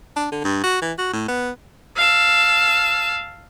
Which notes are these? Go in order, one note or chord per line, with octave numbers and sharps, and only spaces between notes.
D4
D3
G2
F#4
E3
F#4
A2
B3
F5 A5 E6